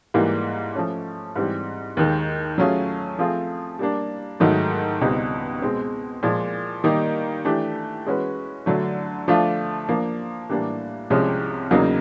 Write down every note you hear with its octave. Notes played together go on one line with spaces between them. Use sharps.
G#2 E3 G3 A#3
F3 A3 C#4
G#2 E3 G3 C4
D#2 D#3 G#3
F#3 A3 C#4 F4 G#4
F3 A3 C4 F4 G#4
G3 A#3 D4
G#2 D#3 F#3 A3
C#2 B2 G3 C4 D#4
B2 G#3 C4
A#2 F3 G#3
D#3 G3 A#3 D#4 G4
E3 A3 D4 G4
E3 G#3 C#4 F#4 B4
D3 F#3 A3
F3 A3 D4 F4
F3 A#3 D4
A2 E3 G3 A#3 D4
C2 C3 F3 G#3 C#4
E2 C#3 F#3 A#3 D#4